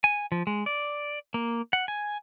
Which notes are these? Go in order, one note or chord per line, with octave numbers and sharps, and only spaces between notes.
G#5
F3
G#3
D5
A#3
F#5
G#5